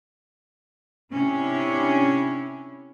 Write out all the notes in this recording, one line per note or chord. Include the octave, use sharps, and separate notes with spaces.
C3 C#4 D4 E4